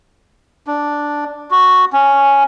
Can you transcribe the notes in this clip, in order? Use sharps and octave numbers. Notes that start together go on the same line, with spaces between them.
D4
F#4
C#4